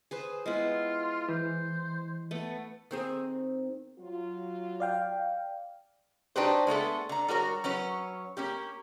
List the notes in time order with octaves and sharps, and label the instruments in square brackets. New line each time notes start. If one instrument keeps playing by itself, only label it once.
[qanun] G#4 B4 C5
[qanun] G#3 B3 E4 [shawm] F4
[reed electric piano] E3 [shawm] C5
[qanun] A3 B3
[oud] D#3 C4 G#4
[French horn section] F#3 F4
[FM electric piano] D5 F5 G5
[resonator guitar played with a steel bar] D4 D#4 F#4 G4 B4 C5
G#3 A3 B3 A4
D3 A#5
G3 F#4 A#4 C#5
F#3 C#4 B4 C#5
A#3 C#4 G4